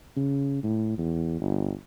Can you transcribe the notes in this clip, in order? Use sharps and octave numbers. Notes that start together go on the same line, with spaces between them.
C#3
A2
E2
G1